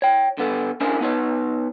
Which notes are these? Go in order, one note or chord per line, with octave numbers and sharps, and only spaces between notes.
C#5 G5
D3 B3 A4
C#4 D4 E4 G#4 A#4 C5
B3 D#4 B4 C#5